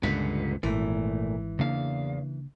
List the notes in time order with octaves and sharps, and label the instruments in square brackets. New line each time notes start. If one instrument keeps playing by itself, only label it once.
[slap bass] C#2 G2 A#2 [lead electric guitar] D3 B4
[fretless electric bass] G#1 [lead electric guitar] A#2 A3 [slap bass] E3
[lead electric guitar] E2 F5 [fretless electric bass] C#3 A#3 D4